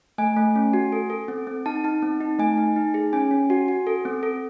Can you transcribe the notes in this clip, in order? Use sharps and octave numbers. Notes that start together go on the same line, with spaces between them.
A3 G#5
A3
C#4
F#4
A4
A4
C4
C4
D#4 A5
D#4 A5
C4
D#4
A3 G#5
D#4
D#4
G#4
C#4 G#5
C#4
F#4
F#4
A4
C4
A4